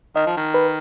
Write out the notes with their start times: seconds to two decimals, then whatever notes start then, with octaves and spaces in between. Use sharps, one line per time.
0.16 D#3 D#5
0.26 F3
0.37 D#3
0.54 B4